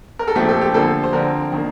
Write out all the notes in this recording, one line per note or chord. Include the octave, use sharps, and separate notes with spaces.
A#4
A4
A#2 F3 A3 C4 G4
A4
G4
D3 F3 A#3 A4
C5
D3 F3 C4 A#4
D#3 A#3